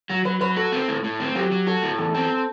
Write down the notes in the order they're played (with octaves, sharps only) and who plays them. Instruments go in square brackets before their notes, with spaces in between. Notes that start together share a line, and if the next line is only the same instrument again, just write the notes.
[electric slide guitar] F#3 [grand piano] F#4 F#5
[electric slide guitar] F#3 [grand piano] B4 B5
[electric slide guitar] F#3 [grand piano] B4 B5
[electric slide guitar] F#4 [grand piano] A4 A5
[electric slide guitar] C4
A2
A2
C4
[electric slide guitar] F#3 [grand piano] G4 G5
[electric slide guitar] F#3
[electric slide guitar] F#4 [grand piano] A4 A5
[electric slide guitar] A2
[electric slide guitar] E2 [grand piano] A4 A5
[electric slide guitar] C4 [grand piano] A4 A5
[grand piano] A4 A5